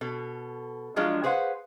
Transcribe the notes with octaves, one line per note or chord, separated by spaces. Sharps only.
B2 A4
F3 F#3 G#3 D4 F4
G#4 B4 C5 F5 F#5